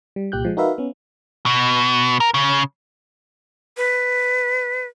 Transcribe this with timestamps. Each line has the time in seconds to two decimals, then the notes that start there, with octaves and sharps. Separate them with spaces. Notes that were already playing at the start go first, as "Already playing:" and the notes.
0.16 G3
0.32 C2 A#2 G4 F#6 G6
0.45 F3 G#3
0.57 D#4 F#4 A#4 B4 E5 F5
0.78 B3 C#4
1.46 B2
2.20 A#4
2.34 C#3
3.77 B4